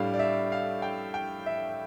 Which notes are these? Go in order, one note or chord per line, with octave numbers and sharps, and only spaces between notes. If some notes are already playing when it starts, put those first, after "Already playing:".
Already playing: A2 G3 D4 F5
D5
E5
F5
G5
G5
E5